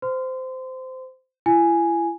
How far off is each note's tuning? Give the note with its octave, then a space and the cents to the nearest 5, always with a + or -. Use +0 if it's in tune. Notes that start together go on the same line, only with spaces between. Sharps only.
C5 -15 C6 -30
E4 +40 G#5 +0